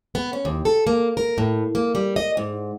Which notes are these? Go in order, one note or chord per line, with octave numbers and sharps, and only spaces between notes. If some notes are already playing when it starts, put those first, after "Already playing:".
B3
C#4
D#2
A4
A#3
A#4
A2
A#3
G3
D#5
G#2